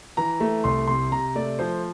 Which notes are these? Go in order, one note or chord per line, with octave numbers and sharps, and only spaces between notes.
E3 A#5
A3
C2 C6
C3 C6
C3 A#5
A3 D5
F3 C5